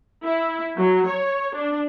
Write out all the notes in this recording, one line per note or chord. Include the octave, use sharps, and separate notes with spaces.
E4
F#3
C#5
D4